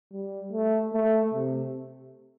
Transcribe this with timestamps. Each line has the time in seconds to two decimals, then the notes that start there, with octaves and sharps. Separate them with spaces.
0.12 G3
0.53 A3
0.93 A3
1.34 C3